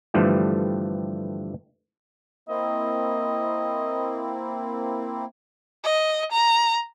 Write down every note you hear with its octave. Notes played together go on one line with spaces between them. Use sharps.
G2 D3 E3 F3 G3 A3
A#3 C4 E4 D#5
D#5
A#5